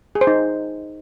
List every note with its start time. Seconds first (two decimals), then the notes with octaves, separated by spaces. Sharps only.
0.15 G#4
0.21 C5
0.27 D#4